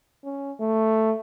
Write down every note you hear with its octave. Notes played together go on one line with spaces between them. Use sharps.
C#4
A3